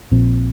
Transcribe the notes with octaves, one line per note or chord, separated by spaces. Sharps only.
A#1 A#2 F3 C4